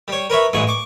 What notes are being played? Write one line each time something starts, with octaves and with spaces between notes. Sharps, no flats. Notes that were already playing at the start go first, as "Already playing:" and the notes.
G3 C#5
A#4 B4 C#5 E5
A1 G2 E3 G#3 C#6
C#6 D6